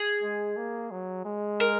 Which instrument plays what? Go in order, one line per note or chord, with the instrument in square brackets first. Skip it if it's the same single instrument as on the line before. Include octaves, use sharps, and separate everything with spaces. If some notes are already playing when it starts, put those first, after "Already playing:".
Already playing: [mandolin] G#4
[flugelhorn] G#3
A#3
F#3
G#3
[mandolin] A#4